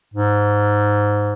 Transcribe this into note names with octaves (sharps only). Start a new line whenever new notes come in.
G#2